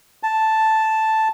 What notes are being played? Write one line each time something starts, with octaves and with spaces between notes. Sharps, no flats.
A5